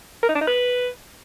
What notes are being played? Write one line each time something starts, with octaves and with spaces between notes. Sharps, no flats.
A#4
D#4
D4
D#4
B4